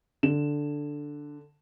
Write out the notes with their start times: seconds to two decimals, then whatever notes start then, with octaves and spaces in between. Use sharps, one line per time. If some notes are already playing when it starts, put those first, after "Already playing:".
0.23 D3 E7